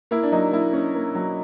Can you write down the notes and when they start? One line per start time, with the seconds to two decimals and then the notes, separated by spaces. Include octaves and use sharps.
0.11 A#3 E4
0.23 D4
0.32 F#3 D#4
0.53 A#3 E4
0.73 A#3 C#4
0.95 A#3
1.15 F#3